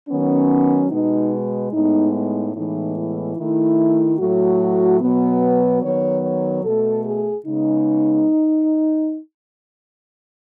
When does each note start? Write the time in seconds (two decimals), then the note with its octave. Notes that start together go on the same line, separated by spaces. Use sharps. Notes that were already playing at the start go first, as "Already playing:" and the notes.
0.09 D#3 F#3 B3 C#4
0.91 B2 G#3 B3 D#4
1.73 A2 G#3 B3 D#4
2.14 D#4
2.55 A2 E3 G#3 B3 D#4
2.96 E4
3.37 D#3 A3 E4
4.19 A2 F#3 A3 F#4
5.01 B2 F#3 B3
5.83 D#3 F#3 B3 C#5
6.24 C#5
6.64 B2 A3 A4
7.05 G#4
7.46 C#3 G#3 B3 D#4